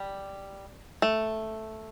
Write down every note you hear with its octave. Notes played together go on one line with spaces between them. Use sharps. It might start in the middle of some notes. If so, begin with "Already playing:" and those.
Already playing: G3
A3